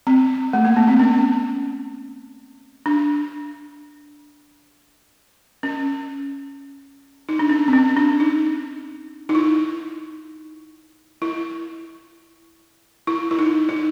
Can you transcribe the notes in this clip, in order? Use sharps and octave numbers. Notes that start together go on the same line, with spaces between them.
C4
A3
A#3
B3
C4
C#4
D4
C#4
D#4
D4
C#4
C4
C#4
D4
D#4
D#4
E4
E4
E4
E4
D#4
D#4